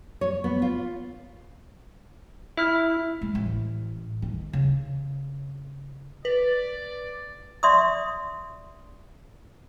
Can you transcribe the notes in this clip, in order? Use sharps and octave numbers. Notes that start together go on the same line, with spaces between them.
C#5
B3
F4
E4 E5 F6
G#3
A1
D#3
C#3
B4 D5
D5 E5 C6 C#6 D#6